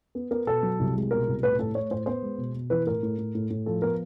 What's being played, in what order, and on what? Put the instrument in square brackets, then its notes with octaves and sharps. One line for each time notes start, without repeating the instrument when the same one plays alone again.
[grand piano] B3
B3 A#4
B2 A4
F#3
C2
G#3
B2 A#4
C2
A2 B4
A2 A4
A3 C#5
A2 C5
B3 C5
G#3
B2
B2
E3 B4
A2 A#4
A2
A2
A2
A2
F3 A4
B3 A#4